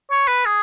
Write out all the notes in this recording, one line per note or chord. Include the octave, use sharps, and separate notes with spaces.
C#5
B4
G#4